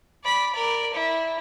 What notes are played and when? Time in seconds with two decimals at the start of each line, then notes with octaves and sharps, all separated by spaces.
0.24 D5 B5
0.53 A#4 D5
0.93 E4